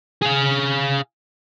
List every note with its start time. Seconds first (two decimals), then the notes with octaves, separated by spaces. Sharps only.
0.22 G#4 F5